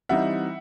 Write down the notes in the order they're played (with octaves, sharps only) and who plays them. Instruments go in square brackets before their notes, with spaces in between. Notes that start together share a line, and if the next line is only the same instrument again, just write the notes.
[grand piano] E3 G3 C4 D#4 E5 F#5